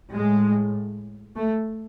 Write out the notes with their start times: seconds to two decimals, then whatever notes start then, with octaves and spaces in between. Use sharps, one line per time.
0.12 A2 G#3
1.35 A3